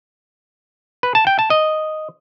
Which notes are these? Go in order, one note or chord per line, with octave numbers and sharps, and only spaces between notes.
B4
A5
G5
A5
D#5